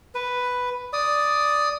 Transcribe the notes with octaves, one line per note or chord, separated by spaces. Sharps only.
B4
D5 D#6